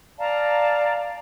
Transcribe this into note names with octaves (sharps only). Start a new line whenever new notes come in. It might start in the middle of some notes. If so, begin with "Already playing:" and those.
D5 F5 A5 A#5